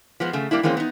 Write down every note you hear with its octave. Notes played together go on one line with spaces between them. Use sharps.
F3 G#3 B3
C#3 A3
G3 A#3 D4 E4
E3 G#3 A#3 C4 C#4
B3 D#4